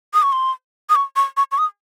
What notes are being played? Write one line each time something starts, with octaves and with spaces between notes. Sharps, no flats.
D#6
C#6
C6
D#6
C#6
C#6
C#6
C#6
D#6